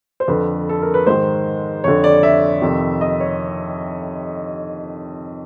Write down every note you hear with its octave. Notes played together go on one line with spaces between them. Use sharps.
C5
F2 D3 B4
A4
A#4
B4
G#2 D#3 C5
F2 D3 C#5
D5
E5
F2 C3 D#3
D#5
C#5